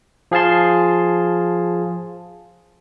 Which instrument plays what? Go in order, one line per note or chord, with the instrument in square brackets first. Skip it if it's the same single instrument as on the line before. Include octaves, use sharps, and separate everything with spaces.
[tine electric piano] F3 G#4 F5 A5 C6